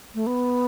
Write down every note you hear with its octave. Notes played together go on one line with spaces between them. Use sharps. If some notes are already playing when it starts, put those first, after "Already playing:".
A3
B3